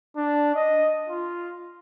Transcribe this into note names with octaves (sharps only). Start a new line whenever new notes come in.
D4
D#5
F4